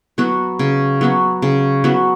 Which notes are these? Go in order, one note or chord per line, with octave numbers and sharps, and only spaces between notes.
F#3 B3 F#4
C#3
F#3 B3 F#4
C#3
F#3 B3 F#4